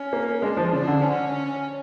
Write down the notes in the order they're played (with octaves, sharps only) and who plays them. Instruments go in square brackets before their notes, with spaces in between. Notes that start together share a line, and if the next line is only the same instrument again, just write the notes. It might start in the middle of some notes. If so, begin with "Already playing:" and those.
Already playing: [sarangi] C#4
[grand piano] A#3
[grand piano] G#3 [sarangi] D4
[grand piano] F3
[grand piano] C#3 [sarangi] D4
[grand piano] D3
[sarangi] C#4